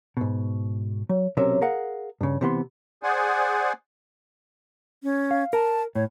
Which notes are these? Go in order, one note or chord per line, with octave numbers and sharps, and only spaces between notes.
G#2 B2
F#3
B1 C3 F#3 C#4 A#4 E5
G#4 A#4 F5 F#5
G2 C#3
C3 E3 B3 C6
G#4 C5 D5 F#5 G#5
C#4
F5
A#4 A5
A2 C#5